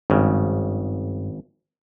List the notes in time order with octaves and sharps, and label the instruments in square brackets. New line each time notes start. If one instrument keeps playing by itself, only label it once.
[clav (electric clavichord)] G#1 C#3 [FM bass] G2